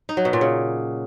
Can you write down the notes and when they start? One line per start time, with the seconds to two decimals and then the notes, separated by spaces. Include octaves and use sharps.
0.09 D#4
0.17 F#3
0.25 B2
0.33 A#2
0.41 C#3